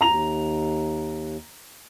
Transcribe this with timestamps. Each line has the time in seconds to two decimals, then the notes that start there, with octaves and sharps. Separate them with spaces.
0.01 D#2 A#5 F7